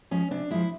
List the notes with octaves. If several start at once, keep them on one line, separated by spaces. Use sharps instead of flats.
F3 G#3 C#4
C3 D4
F3 G#3 E4